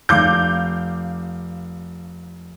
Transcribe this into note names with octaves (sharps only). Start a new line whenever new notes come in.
F1 F5 D6 G6